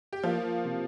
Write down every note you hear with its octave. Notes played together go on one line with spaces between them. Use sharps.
G4
F3 A#3 F4
C3